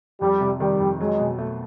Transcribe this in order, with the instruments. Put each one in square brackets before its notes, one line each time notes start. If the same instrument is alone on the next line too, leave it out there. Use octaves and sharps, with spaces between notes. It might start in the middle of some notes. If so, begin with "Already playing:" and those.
[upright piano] F2 [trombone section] G3
[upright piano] C3
[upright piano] D#3 [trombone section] G3
[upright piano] F2
[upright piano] F#3 [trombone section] G#3
[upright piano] B2
A3